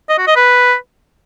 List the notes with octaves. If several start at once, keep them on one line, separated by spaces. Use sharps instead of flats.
D#5
F#4
D#5
B4